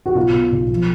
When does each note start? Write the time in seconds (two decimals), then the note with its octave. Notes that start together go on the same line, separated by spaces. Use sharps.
0.06 F#4
0.15 B1 F4
0.34 B2
0.52 B1
0.70 F3